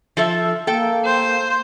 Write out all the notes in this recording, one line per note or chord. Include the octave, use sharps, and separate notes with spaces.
F3 A4 E5
A#3 A4 G5
C5